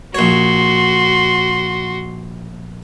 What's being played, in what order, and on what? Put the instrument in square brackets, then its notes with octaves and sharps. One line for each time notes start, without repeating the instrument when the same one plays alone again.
[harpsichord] A#1 C#5 [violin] F#4 C6